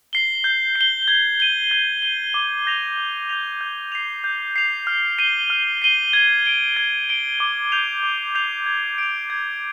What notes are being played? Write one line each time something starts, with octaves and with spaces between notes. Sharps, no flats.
C7 G7
G6
C7
G7
G#6
D#7 G7
G#6
D#7 G7
D6
G6 A#6 F7
D6
G6 A#6 F7
G6
C7 F7
G6
C7 F7
F6
C7 D#7 G7
F6
C7 D#7 G7
G#6
D7 G7
G#6
D7 G7
D6
G6 C7 F7
D6
G6 C7 F7
G#6
D7 F7
G#6